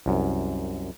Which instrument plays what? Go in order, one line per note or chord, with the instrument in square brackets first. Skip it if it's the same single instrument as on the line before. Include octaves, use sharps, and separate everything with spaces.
[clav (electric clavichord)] C2 F#2